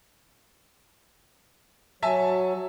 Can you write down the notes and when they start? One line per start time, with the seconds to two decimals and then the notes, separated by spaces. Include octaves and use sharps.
2.03 F#3 E5 G#5 A5